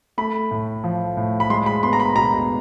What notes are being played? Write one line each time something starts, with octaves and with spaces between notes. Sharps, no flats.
A3 B5
A2
F3
A2
B5
G#3 C6
B5
B3 C6
A#5
B5
B2 A#5